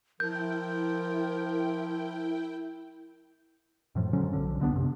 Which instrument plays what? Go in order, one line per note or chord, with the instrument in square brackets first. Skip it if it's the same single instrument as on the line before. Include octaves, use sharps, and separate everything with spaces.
[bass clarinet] F3 [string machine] E4 G5 [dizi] A#4 [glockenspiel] G6
[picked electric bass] F#2 A2 F3
D3 F3 F#3 C#4
B1 D3
C2 D3 B3 D4
F#2 C3